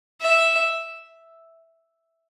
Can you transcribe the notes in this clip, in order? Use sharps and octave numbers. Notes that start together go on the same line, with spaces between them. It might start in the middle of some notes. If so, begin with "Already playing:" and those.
E5